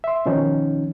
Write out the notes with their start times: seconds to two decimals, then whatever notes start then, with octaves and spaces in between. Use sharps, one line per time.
0.04 E5 C6
0.26 B2 D#3 F3 C#4 D#4